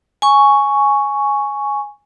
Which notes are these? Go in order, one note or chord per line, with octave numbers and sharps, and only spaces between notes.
G#5 C#6